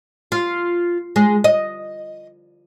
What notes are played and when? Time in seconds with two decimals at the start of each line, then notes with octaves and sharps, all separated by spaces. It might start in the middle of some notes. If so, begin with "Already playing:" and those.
0.32 F4
1.16 G#3
1.44 D#5